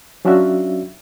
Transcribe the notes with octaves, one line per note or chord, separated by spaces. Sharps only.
F#3 C#4 D4 F4 F#4 E5